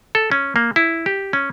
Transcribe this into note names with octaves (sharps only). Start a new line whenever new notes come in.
A4
C#4
A#3
E4
G4
C#4